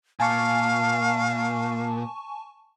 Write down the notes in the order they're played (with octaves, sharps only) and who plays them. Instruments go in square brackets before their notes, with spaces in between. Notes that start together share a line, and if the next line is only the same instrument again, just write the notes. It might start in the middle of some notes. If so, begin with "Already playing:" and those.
[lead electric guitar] A#2 [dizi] F5 [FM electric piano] G#5 A5 C#6